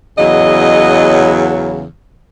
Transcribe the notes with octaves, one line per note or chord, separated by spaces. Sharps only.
E2 C#3 F#3 D#5